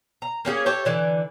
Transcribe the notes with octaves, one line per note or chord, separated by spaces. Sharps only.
A#5
A#3 C#4 F#4 G#4
G4 A4 C#5 E5
D3 E3 D5